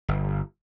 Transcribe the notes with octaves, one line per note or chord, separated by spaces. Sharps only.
G1